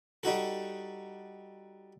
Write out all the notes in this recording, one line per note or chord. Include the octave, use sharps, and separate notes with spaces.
G3 D#4 F#4 A4